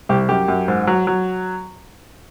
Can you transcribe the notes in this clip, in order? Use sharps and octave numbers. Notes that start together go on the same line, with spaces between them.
C2 G4
F#2 G4
F#2
G#2
F#3
F#3